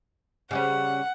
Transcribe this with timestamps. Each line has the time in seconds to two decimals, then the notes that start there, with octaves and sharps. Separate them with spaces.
0.51 C#3 G3 C#4 F#5